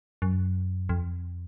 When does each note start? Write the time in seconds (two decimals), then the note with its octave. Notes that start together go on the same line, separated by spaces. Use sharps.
0.22 F#2
0.89 F2